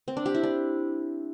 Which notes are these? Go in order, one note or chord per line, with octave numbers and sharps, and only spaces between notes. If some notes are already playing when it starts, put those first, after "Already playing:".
C4
D4
G4
E4
D4